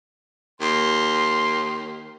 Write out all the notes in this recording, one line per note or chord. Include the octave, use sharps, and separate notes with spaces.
D#2 C6